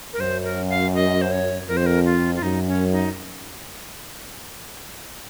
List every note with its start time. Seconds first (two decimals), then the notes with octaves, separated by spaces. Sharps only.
0.13 A#4
0.20 F#2 C5
0.44 A#4
0.70 F5
0.94 D#5
1.22 C5
1.31 C#5
1.68 F2 A#4
1.77 C5
1.86 A#4
2.05 F4
2.35 F4
2.42 F#2 D#4
2.67 C#4
2.92 D#4